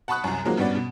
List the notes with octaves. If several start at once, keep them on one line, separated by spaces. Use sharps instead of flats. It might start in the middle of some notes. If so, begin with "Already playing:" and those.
F#5 A5 B5 C#6 D#6 F#6
C2 F#2
D#3 F3 F#3 G#3 A#3 C4
G2 G3 B3 C#4 F#4 D5
B2